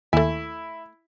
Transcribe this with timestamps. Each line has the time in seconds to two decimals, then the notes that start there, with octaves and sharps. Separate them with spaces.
0.13 D#2 A3 E4 G#5